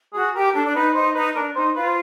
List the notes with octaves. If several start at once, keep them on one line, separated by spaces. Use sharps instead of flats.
F#4 G#4
G4 A#4
D4 A4
D4
D#4 B4
D#4 C5
D#4 B4
D4 A#4
D#4 C5
F4 B4
C5